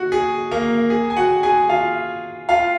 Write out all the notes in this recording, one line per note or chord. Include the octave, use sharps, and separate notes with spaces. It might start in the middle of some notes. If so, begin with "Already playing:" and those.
Already playing: F#4
G#4
A#3 A#4
G#4
G#5
F#4 F#5
G#4 G#5
F4 F5
F4 F5